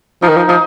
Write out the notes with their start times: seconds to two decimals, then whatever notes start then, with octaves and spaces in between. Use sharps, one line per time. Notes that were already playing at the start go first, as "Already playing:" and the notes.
0.22 F3 D#4
0.29 D#3
0.37 F3
0.48 F3 D#4